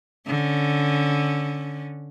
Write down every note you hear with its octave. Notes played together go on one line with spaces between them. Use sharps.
D3 C#4